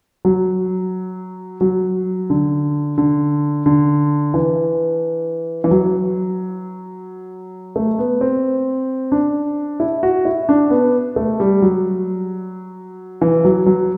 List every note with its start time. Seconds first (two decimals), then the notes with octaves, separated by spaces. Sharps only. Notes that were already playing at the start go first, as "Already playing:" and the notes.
0.25 F#3
1.61 F#3
2.30 D3
2.98 D3
3.66 D3
4.34 E3
5.64 E3
5.71 F#3
7.76 A3
7.99 B3
8.21 C4
9.12 D4
9.80 E4
10.03 F#4
10.25 E4
10.49 D4
10.70 B3
11.16 A3
11.40 G3
11.62 F#3
13.21 E3
13.45 F#3
13.66 F#3